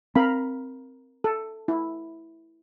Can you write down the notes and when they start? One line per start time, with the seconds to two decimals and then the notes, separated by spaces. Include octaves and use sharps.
0.15 C4 A#4 F5 B5
1.24 A4
1.68 E4